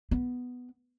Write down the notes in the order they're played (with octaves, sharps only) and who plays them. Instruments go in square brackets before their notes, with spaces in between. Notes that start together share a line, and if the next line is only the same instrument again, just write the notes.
[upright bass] B3